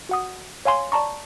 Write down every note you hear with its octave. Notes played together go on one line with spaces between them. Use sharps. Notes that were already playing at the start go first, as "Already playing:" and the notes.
F#4 F#5 D#6
C#5 F5 G#5 C6
D5 A5 A#5 C#6